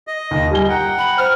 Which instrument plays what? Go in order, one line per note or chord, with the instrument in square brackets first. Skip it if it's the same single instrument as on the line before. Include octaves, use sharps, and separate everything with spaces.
[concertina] D#5
[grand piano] D#2
G3 G#5 G7
[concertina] F#5 G5 [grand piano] A#5
[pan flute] B5
[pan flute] C5 [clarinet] F6